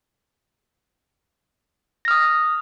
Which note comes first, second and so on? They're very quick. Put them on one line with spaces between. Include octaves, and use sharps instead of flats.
A#6 F6 D#6